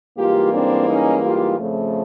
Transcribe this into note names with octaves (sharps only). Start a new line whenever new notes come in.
G#2 E3 G3 A#3 F4 G4
C4 D4
C#4 D#4
F4 G4
F2 C#3 F3 A3